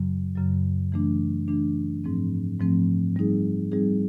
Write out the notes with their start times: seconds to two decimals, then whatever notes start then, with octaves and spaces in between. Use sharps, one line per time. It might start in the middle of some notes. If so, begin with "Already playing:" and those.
Already playing: F#2 C#3 F#3
0.36 F#2 C#3 F#3
0.92 E3 A3 D4
1.48 E3 A3 D4
2.04 G#2 F3 A3 C4
2.60 G#2 F3 A3 C4
3.16 G3 C4 D#4 G#4
3.72 G3 C4 D#4 G#4